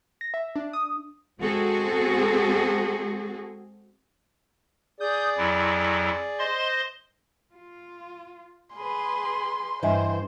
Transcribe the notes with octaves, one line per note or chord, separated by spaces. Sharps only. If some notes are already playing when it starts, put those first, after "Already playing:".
A#6
E5
D4
D#6
G#3 C4 F#4 G#4 A4
G#4 D5 D#6 G6
F2 F#3 E4
C5 D#5 C6
F4
G#4 B4 C6
G2 E3 C5 D#5 E5 G#5